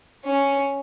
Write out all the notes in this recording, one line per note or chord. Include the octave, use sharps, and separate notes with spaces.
C#4